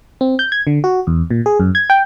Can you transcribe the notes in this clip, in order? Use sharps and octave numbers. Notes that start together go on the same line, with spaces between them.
C4
G6
G#6
D3
F#4
E2
A#2
G#4
F#2
G#6
G5